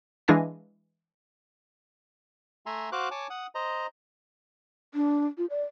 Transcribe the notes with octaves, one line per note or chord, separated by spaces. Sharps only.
E3 G#3 D4 F5 G#5 A#6
A3 E5 G#5 A#5 C6
F#4 C5 F5 D6 F#6
C#5 G#5 A5 D6
F#5 D#6
C5 D#5 A#5
D4
F4
D5